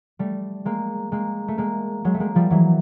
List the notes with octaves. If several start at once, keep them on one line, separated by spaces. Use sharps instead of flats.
G3 A3
G#3 A#3
G#3 A#3
A3
G#3 A#3
F#3 G#3
A3
G#3 A#3
F3 G3
E3 F#3